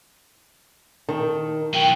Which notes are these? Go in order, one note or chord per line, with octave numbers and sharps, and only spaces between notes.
D#3 A5
B2 F#3 E4 G5